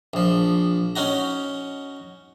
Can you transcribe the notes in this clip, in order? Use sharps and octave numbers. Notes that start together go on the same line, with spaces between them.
A#1 F3
C#4 D#4 F#4 A#5